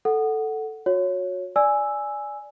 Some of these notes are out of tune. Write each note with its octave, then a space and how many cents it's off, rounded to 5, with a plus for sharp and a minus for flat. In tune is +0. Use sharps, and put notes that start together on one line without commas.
A4 +0 F#5 +5
F#4 -25 C#5 +0
D5 +0 G#5 +0 E6 +0